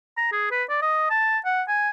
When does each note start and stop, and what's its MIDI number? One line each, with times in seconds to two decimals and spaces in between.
0.17 0.29 82
0.32 0.51 68
0.51 0.64 71
0.69 0.80 74
0.82 1.06 75
1.10 1.38 81
1.45 1.63 78
1.68 1.90 80